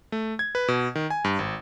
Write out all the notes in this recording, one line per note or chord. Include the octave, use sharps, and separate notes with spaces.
A3
G#6
B4
B2
D#3
G#5
G2
G#1